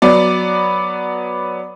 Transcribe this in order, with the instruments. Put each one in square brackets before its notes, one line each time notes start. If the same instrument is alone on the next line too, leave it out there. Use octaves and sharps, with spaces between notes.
[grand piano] F#3 B3 D5